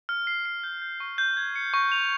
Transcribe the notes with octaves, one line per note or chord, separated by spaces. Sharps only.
F6
C7
C7
G6
G6
C#6
G6
G#6
C#7
C#6
F7